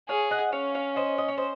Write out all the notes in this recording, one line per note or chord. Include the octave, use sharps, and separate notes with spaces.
G#4 C#5 F5
D#5 F#5
C#4 C#5 F5
C#5 F5
C5 D#5
D#5
C#5
C5 D#5